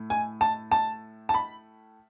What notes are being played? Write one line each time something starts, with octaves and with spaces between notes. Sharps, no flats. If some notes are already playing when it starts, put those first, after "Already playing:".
Already playing: A2 A3
G#5
A5
A5
A5
B5